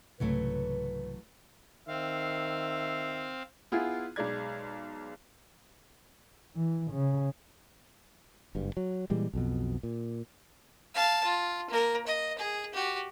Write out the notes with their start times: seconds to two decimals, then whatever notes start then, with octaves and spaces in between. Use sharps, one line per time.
0.20 C2 G#2 C#3 E3 F#3 A3 B4
1.88 D#3 C4 E5 F5
3.72 B3 E4 F4 G#4
4.16 B1 G#3 D5 G#6
6.56 E3
6.91 C#3
8.55 F#1 G2
8.77 F#3
9.10 A#2 E3 G3 G#3
9.33 B1 F2 B2
9.83 A#2
10.95 F5 A5
11.25 F4
11.70 A#3 A#4
12.07 D#5
12.39 G#4
12.74 F#4 G4